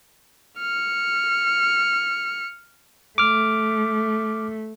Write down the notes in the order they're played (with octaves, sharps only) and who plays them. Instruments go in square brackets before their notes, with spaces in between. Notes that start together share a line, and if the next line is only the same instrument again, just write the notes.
[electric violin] F6 C#7
[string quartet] A3 [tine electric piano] D6 F6